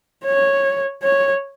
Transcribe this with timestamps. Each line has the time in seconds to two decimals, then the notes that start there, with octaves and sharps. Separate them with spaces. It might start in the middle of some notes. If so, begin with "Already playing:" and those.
0.25 C#5
1.03 C#5